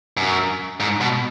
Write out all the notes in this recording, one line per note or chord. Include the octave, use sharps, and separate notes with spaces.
F#2
G#2
B2